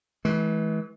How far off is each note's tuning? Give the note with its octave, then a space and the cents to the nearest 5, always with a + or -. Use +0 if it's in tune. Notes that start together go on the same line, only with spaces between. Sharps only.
E3 -25 G#3 +45